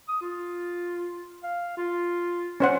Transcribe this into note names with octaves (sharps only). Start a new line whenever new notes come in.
D#6
F4
F5
F4
C#4 C5 F#5